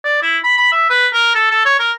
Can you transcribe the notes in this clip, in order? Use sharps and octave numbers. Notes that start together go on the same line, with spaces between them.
D5
E4
B5
B5
E5
B4
A#4
A4
A4
C#5
A#4